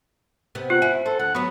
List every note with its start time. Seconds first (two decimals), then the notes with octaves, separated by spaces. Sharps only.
0.55 C3 B3
0.70 F4 F#5
0.82 E4 G#5
1.06 A4 C5
1.19 D2 F#5
1.35 F#3 B3 F#4